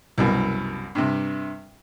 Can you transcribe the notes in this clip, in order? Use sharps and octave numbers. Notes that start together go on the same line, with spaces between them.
C2 F#2 B2
G2 C3